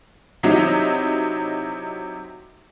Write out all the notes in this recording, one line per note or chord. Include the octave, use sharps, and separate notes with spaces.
C3 F#3 D#4 E4